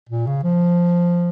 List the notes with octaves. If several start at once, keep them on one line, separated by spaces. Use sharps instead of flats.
A#2
C#3
F3